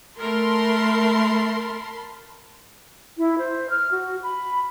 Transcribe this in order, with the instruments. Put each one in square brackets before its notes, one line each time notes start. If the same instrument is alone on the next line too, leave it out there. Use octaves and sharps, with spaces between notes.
[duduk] A3 [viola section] A#4 [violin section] A5 B5 C6
[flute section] E4
C5
F6
F#4
B5